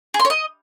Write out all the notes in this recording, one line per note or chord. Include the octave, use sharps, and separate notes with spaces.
G#4
C6
C#5
D#5